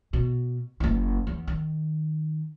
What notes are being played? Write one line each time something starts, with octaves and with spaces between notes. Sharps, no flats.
B2
F#1 E4
E2
D#3